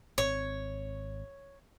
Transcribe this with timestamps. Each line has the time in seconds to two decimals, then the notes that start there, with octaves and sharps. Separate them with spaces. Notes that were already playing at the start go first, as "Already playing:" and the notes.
0.18 G#1 C4 C#5